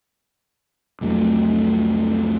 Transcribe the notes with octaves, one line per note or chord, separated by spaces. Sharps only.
C2 F2 F#3 A3